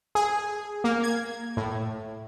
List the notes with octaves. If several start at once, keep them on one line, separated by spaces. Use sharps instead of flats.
G#4
A#3
G#6
A2